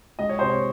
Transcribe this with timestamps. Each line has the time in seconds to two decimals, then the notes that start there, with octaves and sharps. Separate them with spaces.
0.19 G#3 D#5
0.29 C#5
0.39 C3 C5
0.50 C#5